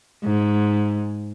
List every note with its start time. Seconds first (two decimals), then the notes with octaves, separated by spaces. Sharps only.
0.24 G#2